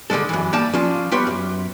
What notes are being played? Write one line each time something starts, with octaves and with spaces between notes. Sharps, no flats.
D3 E3 G3 G#3 A4
F#2 E3
G3 A#3 G5 A5
F3 C#4 D4 F4
G3 B3 G4 B4 C#5 C6
F#2